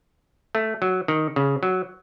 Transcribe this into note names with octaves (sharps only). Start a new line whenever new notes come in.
A3
F#3
D#3
C#3
F#3